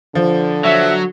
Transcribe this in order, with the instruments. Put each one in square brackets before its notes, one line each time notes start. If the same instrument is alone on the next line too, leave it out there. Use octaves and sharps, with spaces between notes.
[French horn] D3 [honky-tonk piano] F3
[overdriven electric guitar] F#3 [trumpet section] E5